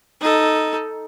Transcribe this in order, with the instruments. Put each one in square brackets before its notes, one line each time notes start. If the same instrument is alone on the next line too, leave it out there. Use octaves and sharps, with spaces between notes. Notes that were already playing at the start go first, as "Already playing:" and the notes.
[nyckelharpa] D#4 A4